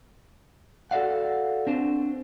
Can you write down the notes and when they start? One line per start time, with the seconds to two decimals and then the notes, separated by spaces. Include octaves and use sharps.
0.91 F#4 A4 D5 F5 F#5
1.67 C4 D4 C5